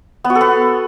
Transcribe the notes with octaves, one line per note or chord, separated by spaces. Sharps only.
B3
F#4
A4
B3